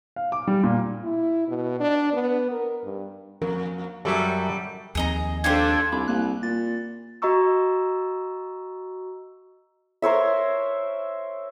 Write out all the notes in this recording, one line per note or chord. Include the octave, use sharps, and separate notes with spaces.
F5
D6
G3
A#2
E4
B2
D4
B3
A#4
G2
F2 A#4
F#2 F#3 G3 A4 E5
D#2 F3 C4 G#4 D#5 A#5
D4 F4 G4 A4 C5 G#6
C2 B5 D6
C2 A#3 F#6
A#2 A6
F#4 D#5 A#5 C#6 E6
A#4 C5 C#5 E5